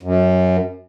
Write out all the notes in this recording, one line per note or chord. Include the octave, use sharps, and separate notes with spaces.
F#2